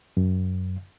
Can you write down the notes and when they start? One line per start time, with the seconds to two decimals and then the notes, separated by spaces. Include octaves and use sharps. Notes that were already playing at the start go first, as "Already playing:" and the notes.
0.17 F#2